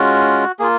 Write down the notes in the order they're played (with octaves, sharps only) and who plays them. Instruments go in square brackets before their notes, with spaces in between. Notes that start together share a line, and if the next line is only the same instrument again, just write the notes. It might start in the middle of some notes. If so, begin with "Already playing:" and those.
Already playing: [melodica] G#3 C#4 F4 F#4
A#3 F4 G#4